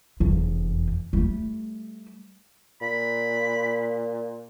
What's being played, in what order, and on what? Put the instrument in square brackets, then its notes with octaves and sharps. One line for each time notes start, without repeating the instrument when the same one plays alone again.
[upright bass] F1 E2
G3 A3
[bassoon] A#2 [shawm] B5